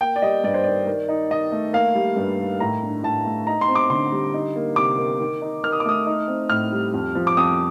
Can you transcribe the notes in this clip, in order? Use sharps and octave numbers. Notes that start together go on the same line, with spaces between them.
A#3 G5
D5
G3 D#5
G2 D5
C5
D#3 D5
D#3
D#4
D#3 D#5
A3
A#3 F5
G3
G2
D#3
A2 A#5
D4
A2 A5
A3
D#4 A#5
C6
C4
D6
D3 C6
G3
D#4
A#3
C3 D6
D#3
D#3
D#4
D#3 F6
D#6
D6
A3 D#6
D#4
C4
A2 F6
G3
F2
F3
D6
F2 D#6